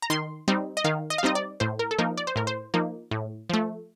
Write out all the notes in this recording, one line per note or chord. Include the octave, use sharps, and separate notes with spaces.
A#5
D#3 C6
G3 C4 D#4
D#5
D#3 F5
D#5
F5
G3 C4 D#4 D#5
D5
A2 C5
A#4
A4
F3 A#3 D#4 A#4
D5
C5
A2 A#4
C5
F3 A#3 D#4
A2
F3 A3